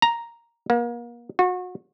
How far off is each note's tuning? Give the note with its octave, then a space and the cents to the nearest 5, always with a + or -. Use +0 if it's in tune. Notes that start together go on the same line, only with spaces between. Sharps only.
A#5 +0
A#3 +35
F#4 -30